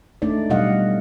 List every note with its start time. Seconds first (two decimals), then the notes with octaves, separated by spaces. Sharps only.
0.22 G#3 A3 D4 D#4 D5
0.50 B2 F#3 G3 D#5 F5 F#5